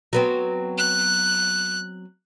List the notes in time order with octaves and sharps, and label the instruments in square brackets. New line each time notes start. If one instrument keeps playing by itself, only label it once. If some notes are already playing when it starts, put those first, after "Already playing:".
[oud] F#3 B3 C4
[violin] F#6